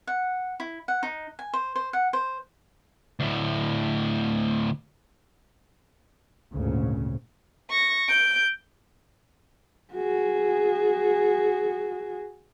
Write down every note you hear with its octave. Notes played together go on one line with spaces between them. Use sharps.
F#5
E4
F#5
D#4
G#5
C5
C5
F#5
C5
D2 A2
G#1 D2 A#2 C#3
C#6 A#6
G6 D7
F#4 G#4